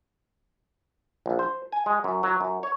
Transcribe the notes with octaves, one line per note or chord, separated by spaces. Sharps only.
A#1
C5
G#5
G#3
F#2
F#3
F#2
C#5